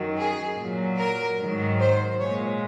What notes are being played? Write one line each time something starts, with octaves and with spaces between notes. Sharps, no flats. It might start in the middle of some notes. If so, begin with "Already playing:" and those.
Already playing: F#2 D#3 F#3
G#4
A#2 F#3
A#4
G#2 D#3 F#3
C5
A#2 G#3 C#5